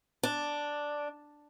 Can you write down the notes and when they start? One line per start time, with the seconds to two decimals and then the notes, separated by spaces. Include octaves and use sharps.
0.23 D4